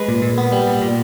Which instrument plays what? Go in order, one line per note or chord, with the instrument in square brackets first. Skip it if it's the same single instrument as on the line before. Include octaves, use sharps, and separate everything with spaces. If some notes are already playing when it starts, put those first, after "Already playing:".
Already playing: [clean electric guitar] G#3 B4
A#2
A#2
B3
G3
A#2
A#2